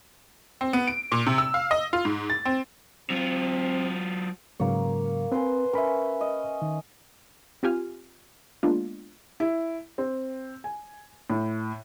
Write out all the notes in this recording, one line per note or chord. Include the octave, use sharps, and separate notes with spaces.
C4
B3
D7
A#2
C3
E6
F5
D#5
F4
G#2
A6
C4
F#3 C4 F4
G#2 C#3 F#3 A#3 C#5
C4 B4 C5 G#5
C#4 A#4 E5 B5
D#5
D#3
C4 F4 G4 G#5 F6
G#3 A#3 B3 D4 F4
E4
C4
G#5
A2